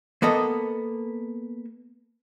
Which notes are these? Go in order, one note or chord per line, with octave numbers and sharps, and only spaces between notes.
A#3 B3 A4 D#5